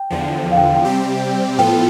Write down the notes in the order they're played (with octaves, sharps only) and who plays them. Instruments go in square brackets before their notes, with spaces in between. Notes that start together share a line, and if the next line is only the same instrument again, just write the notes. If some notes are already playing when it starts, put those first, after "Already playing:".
Already playing: [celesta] G5
[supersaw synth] E2 D3 F3
[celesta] F5
G5
G5
[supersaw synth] C3 G3 C4 G4
[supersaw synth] A2 F3 B3 F4 A4 [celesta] G5